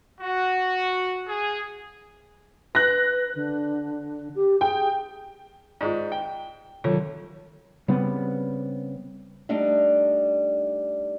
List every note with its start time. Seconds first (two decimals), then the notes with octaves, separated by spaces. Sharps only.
0.20 F#4
1.28 G#4
2.75 B4 F#6 A#6
3.35 D3
4.35 G4
4.61 G#4 G5
5.81 G#2 F4 G#4 D5
6.12 G5
6.84 D2 C3 D#3 F#3 F4 A4 C#5
7.88 C#3 G3 B3 C4
9.49 G3 A3 D4 D#4